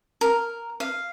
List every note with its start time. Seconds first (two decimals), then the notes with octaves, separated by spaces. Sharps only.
0.21 A#4
0.80 F5